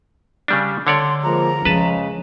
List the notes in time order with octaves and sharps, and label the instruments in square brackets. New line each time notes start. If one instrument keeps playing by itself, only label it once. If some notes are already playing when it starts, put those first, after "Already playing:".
[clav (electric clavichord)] C#3 G3 D4
[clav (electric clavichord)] D3 C#5 D5 [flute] C6
[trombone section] F3 G#3 A#3 [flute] A#5
[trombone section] C#3 G#3 [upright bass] F3 [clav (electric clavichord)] B4 A5